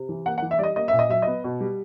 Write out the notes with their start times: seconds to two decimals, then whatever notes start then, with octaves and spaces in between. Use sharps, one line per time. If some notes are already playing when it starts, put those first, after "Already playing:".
Already playing: C3
0.09 E3
0.26 A#3 F#5
0.38 F#5
0.42 E3
0.51 E5
0.59 G3 D5 D#5
0.76 A#3 D#5
0.88 A#2 E5
0.99 D#5
1.09 F#3 E5
1.22 B3 D#5
1.44 B2
1.61 G3